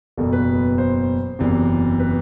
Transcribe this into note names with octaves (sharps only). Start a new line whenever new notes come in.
F#1 E2 B2 A4
B4
C5
F#1 E2 C3 E3
B4